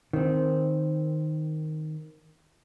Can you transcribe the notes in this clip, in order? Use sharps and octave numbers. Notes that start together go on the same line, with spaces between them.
D#3 C4